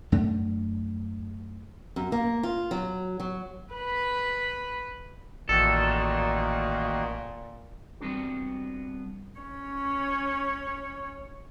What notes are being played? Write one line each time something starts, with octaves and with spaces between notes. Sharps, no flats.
F#2 A3 D4
F#2
A#3
F4
F#3
F#3
B4 B5
A1 A#2 D#3 A#3 F#4 A4
G3 B3 C4 D4 F#4
C#4 C#5